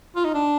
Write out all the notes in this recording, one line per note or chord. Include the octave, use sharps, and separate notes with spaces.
F4
D#4
D4